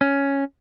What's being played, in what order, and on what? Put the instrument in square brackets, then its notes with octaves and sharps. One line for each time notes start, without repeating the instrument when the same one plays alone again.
[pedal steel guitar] C#4